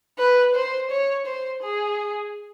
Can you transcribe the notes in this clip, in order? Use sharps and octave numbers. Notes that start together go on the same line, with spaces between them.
B4
C5
C#5
C5
G#4